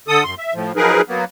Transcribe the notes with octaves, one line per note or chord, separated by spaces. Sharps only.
D3 A4 D#6
F#2 C6
E5
A2 F3
F3 F#3 D#4 G#4 A#4 B4
F#3 A#3 B3